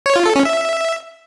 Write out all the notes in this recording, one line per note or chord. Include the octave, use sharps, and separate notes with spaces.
C#5
F4
A4
C#4
E5